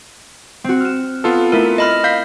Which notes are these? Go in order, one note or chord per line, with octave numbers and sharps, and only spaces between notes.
C4 F#4
F6 E7
B3 F4 A4
A3 E4 A#4
D#5 B5 F6
F5 G6 B6